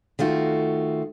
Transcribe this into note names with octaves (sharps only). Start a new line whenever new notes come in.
D#3 A3 F4 F#4